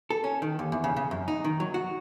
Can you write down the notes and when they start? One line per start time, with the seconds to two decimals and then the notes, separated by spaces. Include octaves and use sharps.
0.10 A4
0.24 C#4
0.42 D#3
0.59 D#2
0.72 E2
0.84 C#3
0.97 C#3
1.11 F#2
1.28 D#4
1.44 D#3
1.60 F#3
1.74 F#4